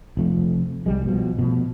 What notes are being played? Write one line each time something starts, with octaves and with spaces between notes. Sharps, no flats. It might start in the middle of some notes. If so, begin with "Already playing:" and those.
F1 F2 A3
C2 G3 G#3
B2 F3
B2 F3 A3